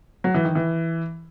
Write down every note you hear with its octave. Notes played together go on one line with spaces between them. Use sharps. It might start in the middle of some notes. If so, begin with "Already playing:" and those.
F#3
E3
D#3
E3